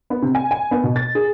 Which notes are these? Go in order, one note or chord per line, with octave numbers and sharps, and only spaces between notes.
B3
C3
G#5
G#5
B3
B2
A6
G#4